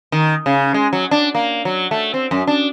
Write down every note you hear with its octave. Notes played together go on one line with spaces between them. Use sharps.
D#3
C#3
G#3
F#3
D4
A#3
F#3
A3
C4
F#2
D4